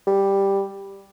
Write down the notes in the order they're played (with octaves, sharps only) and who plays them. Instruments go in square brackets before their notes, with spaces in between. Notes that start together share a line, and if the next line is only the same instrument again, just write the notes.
[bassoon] G3